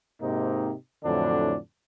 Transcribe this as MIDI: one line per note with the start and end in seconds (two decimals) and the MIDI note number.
0.21 0.72 44
0.21 0.72 48
0.21 0.72 58
0.21 0.72 60
0.21 0.72 63
1.03 1.57 41
1.03 1.57 45
1.03 1.57 50
1.03 1.57 52
1.03 1.57 54
1.03 1.57 62